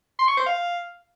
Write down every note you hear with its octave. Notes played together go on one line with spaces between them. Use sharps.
C6
C#6
C5
F5